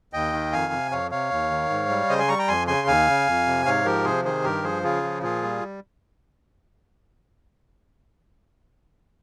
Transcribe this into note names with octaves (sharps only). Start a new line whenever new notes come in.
D#2 D#5 G5
D#3
F2 F5 G#5
C3
F2 C#5 F5
C3 C#5 F5
D#2
D#3
G#2
G3
C#3 C5 D#5
G#5 C6
G3 A#5 C#6
G5 A#5
F2 G#5 C6
C#3 G#5 C6
D#2 F5 G#5
C#3
F2
C3
G#2 C#5 F5
F3 G4 A#4
C3 G#4 C5
D#3 G#4 C5
G2 G4 A#4
F3 G#4 C5
C#3 F4 G#4
F3
A#2 F4 G#4
G3